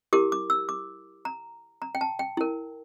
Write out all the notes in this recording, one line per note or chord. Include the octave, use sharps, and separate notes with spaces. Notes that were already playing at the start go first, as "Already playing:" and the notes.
E4 G4 A#4 D6
D6
E6
D6
A#5
A#5
G5
A5
G5
E4 A#4